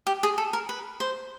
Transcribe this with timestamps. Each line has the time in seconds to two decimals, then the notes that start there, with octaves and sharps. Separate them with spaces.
0.07 G4
0.23 G#4
0.38 A4
0.53 A#4
0.69 B4
1.00 C5